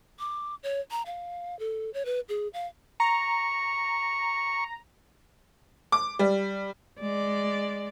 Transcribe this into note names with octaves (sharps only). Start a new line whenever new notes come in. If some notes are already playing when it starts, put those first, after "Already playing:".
D6
C#5
A#5
F5
A4
C#5
B4
G#4
F5
A#5 C#6
D6
G3
G#3 D5